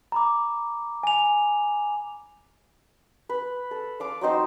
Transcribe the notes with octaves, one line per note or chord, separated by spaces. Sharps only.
A#5 B5 D6
G#5 F7
B4
A4
F5 D6
F#3 C4 D#4 C5